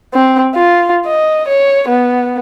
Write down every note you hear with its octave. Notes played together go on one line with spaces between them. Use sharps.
C4
F4
D#5
C#5
B3